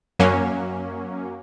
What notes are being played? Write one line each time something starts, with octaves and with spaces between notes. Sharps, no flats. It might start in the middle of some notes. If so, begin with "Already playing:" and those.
F#2 F#3 A#3 C#4